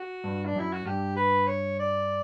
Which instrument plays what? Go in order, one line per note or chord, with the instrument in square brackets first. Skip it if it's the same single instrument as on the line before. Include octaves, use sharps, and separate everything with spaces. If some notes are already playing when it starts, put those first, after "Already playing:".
Already playing: [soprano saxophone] F#4
[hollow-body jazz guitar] G2
[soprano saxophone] D4
[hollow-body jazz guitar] F#2 [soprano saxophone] E4
[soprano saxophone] F#4
[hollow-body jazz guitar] G2 [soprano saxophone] G4
[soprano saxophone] B4
C#5
D5